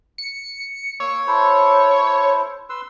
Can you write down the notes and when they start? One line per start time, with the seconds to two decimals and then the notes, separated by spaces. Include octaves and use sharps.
0.18 C#7
1.00 A#3 C#5 E6
1.27 E4 A4 C5
2.70 B4 C6 E6